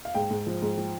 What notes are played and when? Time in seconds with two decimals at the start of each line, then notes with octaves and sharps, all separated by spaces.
0.05 F5
0.15 G#2 G5
0.31 G#2
0.47 F3
0.62 G#2
0.78 F3